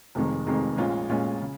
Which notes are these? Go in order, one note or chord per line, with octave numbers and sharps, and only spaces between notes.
F1 F2 C3 D#3 G#3
F1 F2 C3 D#3 G#3
A#1 A#2 G#3 C#4 F4
A#1 A#2 G#3 C#4 F4
C#3